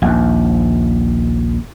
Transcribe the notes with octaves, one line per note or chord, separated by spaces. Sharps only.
A#1 D#2